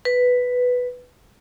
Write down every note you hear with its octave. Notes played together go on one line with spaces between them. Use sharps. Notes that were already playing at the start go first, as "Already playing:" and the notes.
B4